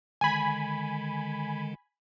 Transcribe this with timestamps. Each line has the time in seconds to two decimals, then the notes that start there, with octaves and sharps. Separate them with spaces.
0.21 D3 D#3 G#3 G#5 B5